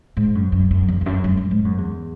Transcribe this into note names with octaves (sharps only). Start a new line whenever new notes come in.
G#2
F#2
F#2
F#2
E2
E2
F#2
F#2
F#2
G#2
F#2
E2